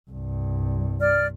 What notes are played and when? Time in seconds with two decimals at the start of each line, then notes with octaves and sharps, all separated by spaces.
0.11 C2 G2
1.01 D5 F6